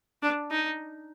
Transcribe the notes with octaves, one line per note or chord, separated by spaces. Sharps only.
D4
D#4